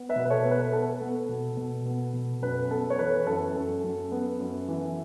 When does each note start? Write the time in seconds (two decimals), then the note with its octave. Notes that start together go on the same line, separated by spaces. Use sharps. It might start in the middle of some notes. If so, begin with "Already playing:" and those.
Already playing: B3
0.09 B4 E5
0.16 B2
0.25 B4
0.30 A4 C#5
0.45 B3
0.51 B4
0.62 B4
0.73 B3 A4
1.01 B3
1.29 B2
1.57 B2
1.86 B3
2.13 B2
2.42 F#2 B4
2.70 B3 A4
2.90 C#5
2.99 E3 B4
3.27 F#2 A4
3.55 F#2
3.84 F#2
4.12 B3
4.39 F#2
4.68 E3